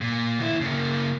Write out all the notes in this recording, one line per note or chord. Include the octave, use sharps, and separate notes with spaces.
A#2
D#2 E4
C#3 A#3